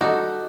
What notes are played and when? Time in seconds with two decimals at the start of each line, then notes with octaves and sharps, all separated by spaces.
0.01 G3 D#4 F#4 A4